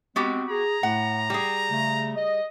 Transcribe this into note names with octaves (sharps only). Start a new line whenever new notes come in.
G#3 B3 C4 F#4 G4
G#4 A#5
A2 A3 F#5
G3 G#4
C#3 A3
D#5